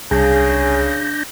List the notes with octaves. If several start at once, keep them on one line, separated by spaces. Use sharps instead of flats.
C2 C#3 D4 G#4 G6 A#6